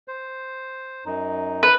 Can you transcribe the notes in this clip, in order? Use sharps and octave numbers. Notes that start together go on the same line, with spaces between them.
C5
F#2 D#4
B4